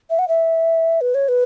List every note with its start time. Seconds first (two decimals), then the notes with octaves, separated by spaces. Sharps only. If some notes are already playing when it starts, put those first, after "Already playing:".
0.10 E5
0.19 F#5
0.28 E5
1.01 B4
1.14 C#5
1.28 B4